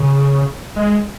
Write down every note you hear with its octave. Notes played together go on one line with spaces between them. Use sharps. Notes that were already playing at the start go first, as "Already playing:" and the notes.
Already playing: C#3
G#3